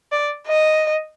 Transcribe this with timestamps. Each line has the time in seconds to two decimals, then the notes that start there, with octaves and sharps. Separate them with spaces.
0.12 D5
0.47 D#5